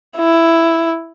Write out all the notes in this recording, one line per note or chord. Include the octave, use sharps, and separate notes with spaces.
E4